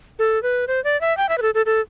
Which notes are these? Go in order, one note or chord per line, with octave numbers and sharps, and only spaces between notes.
A4
B4
C5
D5
E5
G5
E5
B4
A4
A4
A4